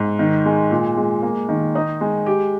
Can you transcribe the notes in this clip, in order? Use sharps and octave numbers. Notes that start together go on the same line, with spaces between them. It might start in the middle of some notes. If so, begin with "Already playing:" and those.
Already playing: G#2
D#3
G#3
A#2
G#3
A#3
D#3
D#4
G#3
G4